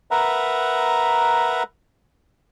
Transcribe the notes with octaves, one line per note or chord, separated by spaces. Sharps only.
A#4 B4 E5 F#5 A#5